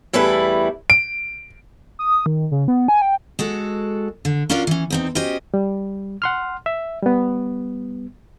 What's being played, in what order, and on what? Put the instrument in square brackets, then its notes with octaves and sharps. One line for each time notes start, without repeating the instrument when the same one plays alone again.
[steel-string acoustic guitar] E2 G3 A3 E4 B4
[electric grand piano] D7
[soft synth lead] D#6
D#3
C#3
B3
G#5
G5
[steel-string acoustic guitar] G#3 F#4 A4
D3
C#4 D4 F4 F#4 A#4 D5
E3 C#4
E2 C4 D#4
C#4 F#4 G4 C5 D#5
[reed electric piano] G3
F#5 C6 F6
E5
G3 B3